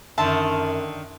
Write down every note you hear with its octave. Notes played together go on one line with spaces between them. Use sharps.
F#2 D3 D#3 E5 A5 C6